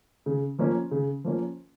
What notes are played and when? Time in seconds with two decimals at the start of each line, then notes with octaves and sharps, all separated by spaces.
0.26 C#3
0.59 F3 A#3 C#4
0.91 C#3
1.24 F3 A#3 C#4